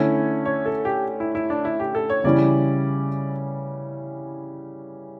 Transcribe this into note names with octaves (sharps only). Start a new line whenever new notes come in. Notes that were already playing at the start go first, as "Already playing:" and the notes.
Already playing: D3 A3 C#4 E4 C#5
C#5
A4
G4
E4
E4
D4
E4
G4
A4
C#5
C#3 E3 G3 C#4 E4 D5